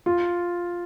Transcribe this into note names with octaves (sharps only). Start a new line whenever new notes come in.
F4